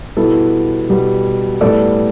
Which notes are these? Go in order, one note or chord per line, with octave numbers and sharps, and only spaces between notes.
B2 G3 B3 E4 A4
B2 G3 B3
A2 G3 B3 A4 D5